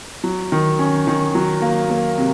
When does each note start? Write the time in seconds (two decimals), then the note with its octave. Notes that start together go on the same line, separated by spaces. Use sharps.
0.24 F#3
0.52 D#3
0.79 C#4
1.07 D#3
1.35 F#3
1.62 A#3
1.90 A#3
2.18 C3